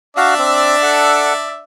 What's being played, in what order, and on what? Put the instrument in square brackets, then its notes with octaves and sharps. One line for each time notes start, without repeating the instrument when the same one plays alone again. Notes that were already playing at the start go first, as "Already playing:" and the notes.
[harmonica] D4 D5 E5 [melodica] F#4 F5
[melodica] C4
A4 F#5